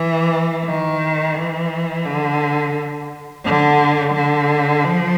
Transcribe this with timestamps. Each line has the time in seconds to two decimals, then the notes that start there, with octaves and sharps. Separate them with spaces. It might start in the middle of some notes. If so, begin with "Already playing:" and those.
Already playing: E3
0.65 D#3
1.35 E3
2.05 D3
3.44 D3
4.14 D3
4.84 F3